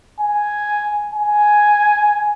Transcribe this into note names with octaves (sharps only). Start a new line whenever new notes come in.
G#5
G#5